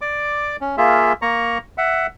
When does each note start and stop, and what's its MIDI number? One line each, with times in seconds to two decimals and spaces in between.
0.01 0.56 74
0.01 0.56 86
0.61 0.76 61
0.78 1.13 58
0.78 1.13 65
0.78 1.13 68
0.78 1.13 76
1.22 1.58 58
1.22 1.58 82
1.22 1.58 85
1.78 2.07 76
1.78 2.07 78